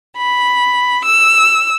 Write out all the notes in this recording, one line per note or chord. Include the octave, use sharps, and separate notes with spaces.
B5
E6